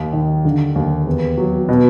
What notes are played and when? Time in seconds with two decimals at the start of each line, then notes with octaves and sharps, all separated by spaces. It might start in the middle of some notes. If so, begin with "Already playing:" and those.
Already playing: D#2
0.13 D#3
0.45 D3
0.75 D#2
1.07 E2
1.38 F#3
1.69 B2